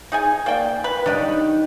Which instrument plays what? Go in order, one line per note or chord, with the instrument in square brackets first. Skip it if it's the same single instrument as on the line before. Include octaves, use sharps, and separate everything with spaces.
[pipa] D#4 G#4 G#5
A#3 D5 G5
B4
[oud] D#3 D#4 C#5 [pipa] D4 G4